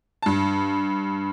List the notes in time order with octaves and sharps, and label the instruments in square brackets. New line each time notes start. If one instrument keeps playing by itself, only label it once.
[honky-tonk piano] G2 A5